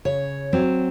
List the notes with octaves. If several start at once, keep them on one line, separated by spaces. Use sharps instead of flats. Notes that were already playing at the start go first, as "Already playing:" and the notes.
C#3 C#5
F#3 C4